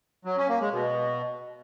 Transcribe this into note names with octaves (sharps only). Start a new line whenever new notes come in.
F#3
C#4
A#3
G#3
B2